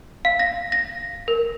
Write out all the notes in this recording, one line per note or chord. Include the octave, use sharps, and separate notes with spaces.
F5
A#6
A#6
A#4